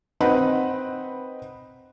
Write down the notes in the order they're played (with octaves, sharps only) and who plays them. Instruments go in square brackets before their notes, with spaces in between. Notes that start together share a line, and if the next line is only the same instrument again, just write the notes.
[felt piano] C4 D#4 B4 D#5 F#5 B5